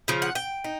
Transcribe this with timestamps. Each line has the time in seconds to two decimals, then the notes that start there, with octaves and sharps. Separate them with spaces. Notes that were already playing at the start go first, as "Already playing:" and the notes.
0.08 C#3 F3
0.22 F#5
0.35 G5
0.64 D#4